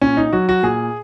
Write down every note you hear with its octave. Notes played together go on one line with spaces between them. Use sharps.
A#2 C#4
D#4
F#3 F#4
F#4
A#2 G#4